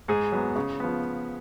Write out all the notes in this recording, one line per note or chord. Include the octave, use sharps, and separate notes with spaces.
G#2 G#4
F#3 B3
C#3
F3 B3